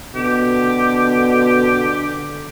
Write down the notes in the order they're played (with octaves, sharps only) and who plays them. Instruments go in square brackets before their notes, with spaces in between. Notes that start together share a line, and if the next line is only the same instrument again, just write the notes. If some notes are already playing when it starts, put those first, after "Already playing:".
[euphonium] B2 [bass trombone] D3 [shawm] G4